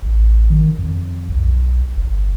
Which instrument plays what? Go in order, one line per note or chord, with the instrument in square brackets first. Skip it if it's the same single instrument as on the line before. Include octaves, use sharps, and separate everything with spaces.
[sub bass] A1
D#3
F2
B1
G1